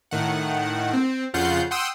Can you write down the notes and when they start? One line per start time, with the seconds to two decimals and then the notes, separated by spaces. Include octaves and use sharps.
0.11 A2 D#3 F#5
0.93 C4
1.34 F2 C#3 F4 F#5 G6 C7
1.71 F#5 G5 C6 D#6 E6